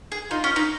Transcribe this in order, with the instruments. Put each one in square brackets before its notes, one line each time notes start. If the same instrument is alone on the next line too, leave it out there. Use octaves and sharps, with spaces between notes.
[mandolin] G#4
[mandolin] D#4 [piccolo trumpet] F4
[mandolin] C#4
D#4